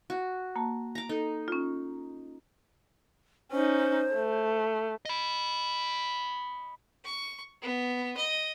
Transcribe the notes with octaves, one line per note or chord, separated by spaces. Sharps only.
F#4
A#3 A5
A#5 D6
D#4 A4
C#4 F4
C#4 D#4 C5
A3
D#5 B5
C#6
B3
D#5